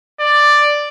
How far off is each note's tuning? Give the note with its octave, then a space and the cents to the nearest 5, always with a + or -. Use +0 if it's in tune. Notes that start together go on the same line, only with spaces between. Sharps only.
D5 +5